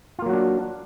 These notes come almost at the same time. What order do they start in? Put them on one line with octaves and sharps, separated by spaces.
F4 A#3 F#3 F#4 D4